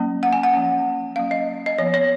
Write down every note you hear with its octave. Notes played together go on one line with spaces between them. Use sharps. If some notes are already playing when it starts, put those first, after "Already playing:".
Already playing: F#3 A#3 C#4
F#5
G#5
F#5
F3 A#3 C#4
F#3 A#3 C#4 F5
D#5
D#5
F3 B3 C#5
C#5